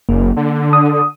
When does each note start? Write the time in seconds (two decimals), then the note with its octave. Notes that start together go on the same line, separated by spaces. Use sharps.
0.09 F#1 A#3
0.37 D3
0.73 D#6